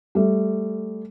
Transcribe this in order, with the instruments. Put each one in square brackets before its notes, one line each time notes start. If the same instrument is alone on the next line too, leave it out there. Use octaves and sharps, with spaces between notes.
[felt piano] G3 A3